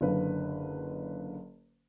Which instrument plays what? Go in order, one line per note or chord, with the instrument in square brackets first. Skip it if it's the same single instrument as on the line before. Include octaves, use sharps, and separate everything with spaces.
[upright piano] F#1 D3 B4 F5